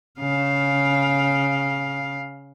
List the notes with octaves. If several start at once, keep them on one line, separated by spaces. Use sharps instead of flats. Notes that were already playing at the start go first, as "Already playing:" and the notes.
C#3 F5